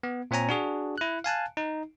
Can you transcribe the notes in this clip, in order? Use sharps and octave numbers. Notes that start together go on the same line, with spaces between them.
B3
A#2 C4 C#5 G#5 A#5
D4 F#4 G#4
E4 F#6
F5 G#5 A5 F#6
D#4